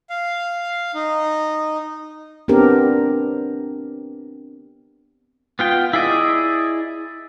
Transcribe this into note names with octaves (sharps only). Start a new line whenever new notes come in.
F5
D#4
B3 C4 D4 G4 A#4
B3 F4 G5
E4 G#4 D5 D#5